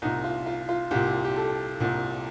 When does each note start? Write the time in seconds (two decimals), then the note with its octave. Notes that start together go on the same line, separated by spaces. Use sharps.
0.02 C2 D#4
0.05 A#2
0.24 F4
0.46 F4
0.69 F4
0.91 C2 A#2 G4
1.24 G4
1.36 A4
1.80 C2 A#2